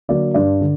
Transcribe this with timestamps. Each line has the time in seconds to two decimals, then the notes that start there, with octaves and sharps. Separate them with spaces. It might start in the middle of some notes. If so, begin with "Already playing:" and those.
0.08 D3 F#3 A#3 D5
0.34 G2 D5
0.61 D3